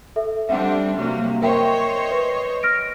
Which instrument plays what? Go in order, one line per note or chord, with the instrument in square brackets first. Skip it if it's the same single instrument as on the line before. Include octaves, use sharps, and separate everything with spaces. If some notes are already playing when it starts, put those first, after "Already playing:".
[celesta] A4 E5
[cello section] G3 C4 D4 [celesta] E5 F#5
[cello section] C3 F#3 A#3
[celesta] A#4 E5 G5 [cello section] C5 C#5 D#5
[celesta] B4
F6 A#6 D7